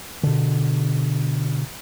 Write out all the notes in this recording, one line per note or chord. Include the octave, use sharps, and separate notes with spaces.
B2 D3